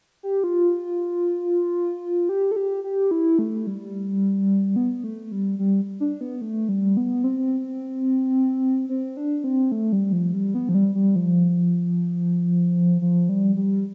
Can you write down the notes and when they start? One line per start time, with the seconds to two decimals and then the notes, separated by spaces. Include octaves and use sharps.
0.23 G4
0.44 F4
2.29 G4
2.51 A4
2.56 G4
2.84 G4
3.11 E4
3.39 A3
3.67 G3
4.76 B3
5.04 A3
5.32 G3
5.59 G3
6.00 D4
6.21 B3
6.41 A3
6.69 G3
6.97 B3
7.24 C4
8.89 C4
9.17 D4
9.44 C4
9.72 A3
9.92 G3
10.12 F3
10.33 G3
10.54 B3
10.69 F3
10.75 G3
10.95 G3
11.16 F3
13.02 F3
13.29 G3
13.57 G3